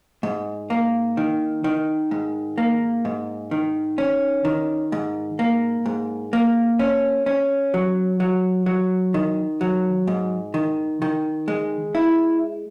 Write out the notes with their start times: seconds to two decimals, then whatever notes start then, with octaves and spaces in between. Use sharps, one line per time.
0.23 G#2
0.70 A#3
1.17 D#3
1.64 D#3
2.11 G#2
2.58 A#3
3.05 G#2
3.51 D#3
3.98 C#4
4.45 D#3
4.92 G#2
5.39 A#3
5.86 G#2
6.33 A#3
6.79 C#4
7.26 C#4
7.74 F#3
8.20 F#3
8.66 F#3
9.14 D#3
9.61 F#3
10.07 G#2
10.54 D#3
11.02 D#3
11.48 G#3
11.95 E4